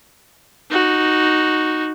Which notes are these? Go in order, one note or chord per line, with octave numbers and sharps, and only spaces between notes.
D#4 F#4